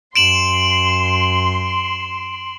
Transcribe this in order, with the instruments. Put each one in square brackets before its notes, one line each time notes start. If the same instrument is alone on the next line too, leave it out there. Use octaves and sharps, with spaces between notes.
[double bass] F#2 [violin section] C6 [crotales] D7 E7 F#7